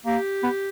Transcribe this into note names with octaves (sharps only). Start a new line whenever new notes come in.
A#3 G4
B3